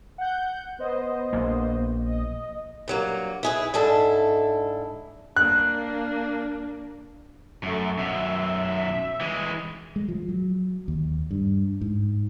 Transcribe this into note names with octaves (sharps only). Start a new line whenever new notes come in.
F#5 G6
B3 C5 D#5
A#1 A#3
D#5
G2 F#3 A#3
E4 G#4 B4
G#2 D4 E4 A4
A#3 D4 F#6
F#2 A3
F#2 B2 E5
E3 G#3
G#3
F3
F#3
D#2
G2
G#2